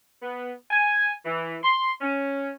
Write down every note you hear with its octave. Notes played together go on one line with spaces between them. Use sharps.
B3
G#5
E3
C6
C#4